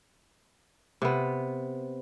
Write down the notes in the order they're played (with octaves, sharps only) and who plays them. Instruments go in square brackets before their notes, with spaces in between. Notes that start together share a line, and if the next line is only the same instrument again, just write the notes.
[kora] C3 B3